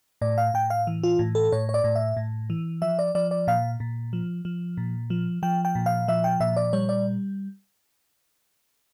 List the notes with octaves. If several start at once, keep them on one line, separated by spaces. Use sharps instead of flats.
A2 D5
F5
A2 G5
F5
E3
F4
A2
A4
A2 C#5
C#5
D5
A2
E5
A2
E3
F3 E5
D5
F3 D5
D5
A#2 F5
A#2
F3
F3
A#2
F3
F3 G5
G5
A#2
F5
F3 E5
G5
A#2 E5
D5
G3 C#5
D5